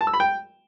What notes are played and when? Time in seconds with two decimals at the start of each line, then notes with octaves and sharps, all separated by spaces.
0.01 A5
0.07 E6
0.14 B5
0.20 G5